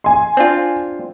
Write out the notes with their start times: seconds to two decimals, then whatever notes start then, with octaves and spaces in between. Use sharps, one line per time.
0.04 G#5 C6
0.37 C4 D4 F4